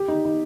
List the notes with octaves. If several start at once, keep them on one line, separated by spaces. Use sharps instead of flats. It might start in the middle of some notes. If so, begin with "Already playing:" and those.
Already playing: G4
D#4
D#4